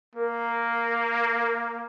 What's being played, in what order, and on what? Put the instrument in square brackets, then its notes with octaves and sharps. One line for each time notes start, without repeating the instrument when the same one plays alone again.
[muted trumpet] A#3 [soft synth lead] A#4